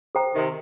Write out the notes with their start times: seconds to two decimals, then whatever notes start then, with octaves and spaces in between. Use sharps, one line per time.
0.15 A4 C5 G5 A#5
0.34 C3 D#3